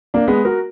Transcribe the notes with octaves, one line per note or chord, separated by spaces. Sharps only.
A#3 D4
G#3 B3
F#4 A#4